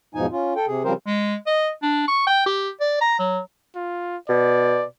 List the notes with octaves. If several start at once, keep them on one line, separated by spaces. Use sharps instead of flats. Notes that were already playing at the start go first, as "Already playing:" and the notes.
E2 G#2 B2 F3 D#4 G#5
C#4 F4
A4 G5
C3 G#4
C#3 F3 G3 C4 A#4 C5
G#3
D#5
D4
C#6
G5
G4
D5
A#5
F#3
F4
B2 D5